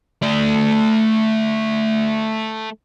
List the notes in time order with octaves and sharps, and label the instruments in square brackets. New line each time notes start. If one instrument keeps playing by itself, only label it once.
[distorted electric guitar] A3 D5